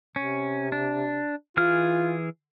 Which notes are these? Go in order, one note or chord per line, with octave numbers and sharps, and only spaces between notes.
C3 C#4
D4
E3 F4 G#4 F6